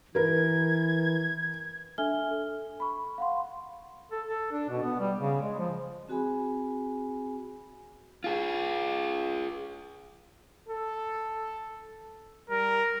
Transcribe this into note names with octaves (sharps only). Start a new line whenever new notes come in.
E3 A#4 B4 G#6
D4 A4 E5 G#5 F6 G7
A4
B5 C#6
F5 F#5 C6
A4
A4
D4
B2
B3
G3
C#3
G#3
F3
C4 F#4 G#4 G#5 B5
F4 G#4
A4
G3 A#4